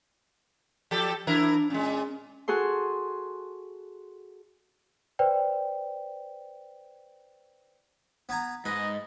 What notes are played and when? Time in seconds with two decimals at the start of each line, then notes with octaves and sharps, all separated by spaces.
0.91 F3 G4 A4
1.27 E3 D4 E4 A#4
1.70 A#2 G#3 C#4
2.48 F#4 G#4 A4 C6
5.19 B4 C5 D5 G5
8.29 B3 G#5 A#5
8.65 G#2 B4 D#5